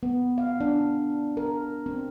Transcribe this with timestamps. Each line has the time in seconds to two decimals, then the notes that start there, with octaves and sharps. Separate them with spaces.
0.03 B3
0.38 F5
0.61 D4
1.37 A#4
1.86 C4